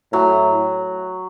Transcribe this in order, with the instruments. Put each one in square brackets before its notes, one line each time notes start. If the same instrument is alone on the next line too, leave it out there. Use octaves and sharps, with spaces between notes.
[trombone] A2 [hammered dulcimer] F#3